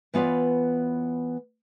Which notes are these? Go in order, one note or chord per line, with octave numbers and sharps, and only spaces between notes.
E3 B3 F4 C#5 D5